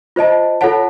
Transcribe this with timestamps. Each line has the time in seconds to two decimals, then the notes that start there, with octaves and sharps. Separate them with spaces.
0.16 F4 C5 D#5 A5
0.61 F4 A4 C#5 F#5 A5